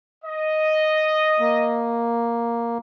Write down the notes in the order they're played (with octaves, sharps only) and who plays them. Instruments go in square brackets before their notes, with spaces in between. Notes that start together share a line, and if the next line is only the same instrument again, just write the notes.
[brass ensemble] D#5
[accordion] A#3